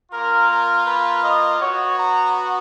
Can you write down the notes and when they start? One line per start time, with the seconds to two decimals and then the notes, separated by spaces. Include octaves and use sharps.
0.12 A#3 F4 A#4
0.49 A#4
0.85 B4
1.22 D#5
1.59 B3 F#4 C#5
1.97 A#5